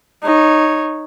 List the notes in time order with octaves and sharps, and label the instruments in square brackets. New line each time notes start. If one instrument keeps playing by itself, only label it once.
[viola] D#4 C#5